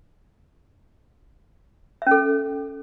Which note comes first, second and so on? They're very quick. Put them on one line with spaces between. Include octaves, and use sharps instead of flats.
E5 C#4 A4